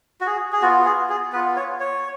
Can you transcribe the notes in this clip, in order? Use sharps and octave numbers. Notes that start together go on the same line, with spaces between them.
F#4
G#4
G#4
B3 F4 F#4
G#4
G#4
B3 F4 B4
C#5
C#5